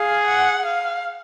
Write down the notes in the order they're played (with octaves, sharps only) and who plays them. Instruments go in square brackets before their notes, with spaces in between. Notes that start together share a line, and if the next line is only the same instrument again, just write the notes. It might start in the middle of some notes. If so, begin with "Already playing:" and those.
Already playing: [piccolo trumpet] G#4 [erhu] F5
[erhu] F#5
F5